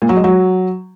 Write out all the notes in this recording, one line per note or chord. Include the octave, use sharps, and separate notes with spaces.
A#2
F#3
G#3
F#3